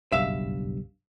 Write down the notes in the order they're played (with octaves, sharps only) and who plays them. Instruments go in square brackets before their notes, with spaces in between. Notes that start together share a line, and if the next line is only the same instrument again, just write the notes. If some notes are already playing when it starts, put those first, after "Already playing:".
[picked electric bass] F#1 B1 G2 [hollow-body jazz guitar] E5 F5